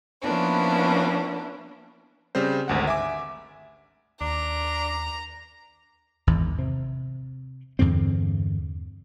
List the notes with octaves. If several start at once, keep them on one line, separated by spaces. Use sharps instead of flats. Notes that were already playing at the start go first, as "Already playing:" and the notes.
F3 A#3 B3 C#4 D4 E4
C#3 G3 C4 C5
G#1 D2 F#5
E5 G#5 D6
D#2 D4 A#5
G#1 E2
C3
E2 G2 D3 C4